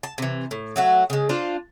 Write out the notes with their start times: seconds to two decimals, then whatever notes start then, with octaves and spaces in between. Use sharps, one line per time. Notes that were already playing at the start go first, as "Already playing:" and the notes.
0.03 A5
0.18 C3 E3
0.51 A2
0.76 F#3 A3 F#4
1.10 C#3 G#3
1.29 D4 F4 C5